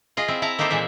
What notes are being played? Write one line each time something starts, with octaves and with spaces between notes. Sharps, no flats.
F4 G#4 D#5
C4 E4
E4 A5 A#5
A#3 D#4 G4 A4 C5
A#2 E3 G#3 E5